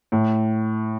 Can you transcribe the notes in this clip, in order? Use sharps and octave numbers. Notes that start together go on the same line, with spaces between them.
A2